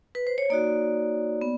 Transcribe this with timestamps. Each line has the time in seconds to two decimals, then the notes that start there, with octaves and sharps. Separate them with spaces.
0.15 B4
0.27 C5
0.38 C#5
0.50 A#3 D#4 F#4 D5
1.41 B3